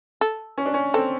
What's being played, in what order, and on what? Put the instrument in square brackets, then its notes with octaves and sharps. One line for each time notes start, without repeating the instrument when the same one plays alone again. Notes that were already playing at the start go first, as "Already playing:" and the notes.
[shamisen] A4
[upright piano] C#4
D4
C#4
[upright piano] C4 [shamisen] A4